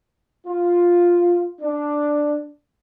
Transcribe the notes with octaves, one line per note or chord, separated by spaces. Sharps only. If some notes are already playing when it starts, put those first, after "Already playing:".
F4
D4